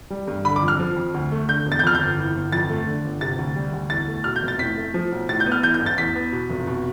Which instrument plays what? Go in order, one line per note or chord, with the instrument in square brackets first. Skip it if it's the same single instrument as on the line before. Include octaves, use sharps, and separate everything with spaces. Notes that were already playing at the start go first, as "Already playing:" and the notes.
[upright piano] G3
G2
D3 B5
D6
F2
F6
F3
F2
D2
A3
D3 G6
E1
A6
G6
F2 F6
G6
G1
E3
G1
F2 A6
A3
D3
G1
C3 A6
D2
G3
D2
E2 A6
A3
B2 F6
G6
F1
A6
A2 B6
A3
F3
B1
A2 A6
G6
B3
F6
E3 G6
G6
A1
A6
E2 B6
B3
B2
F1
B2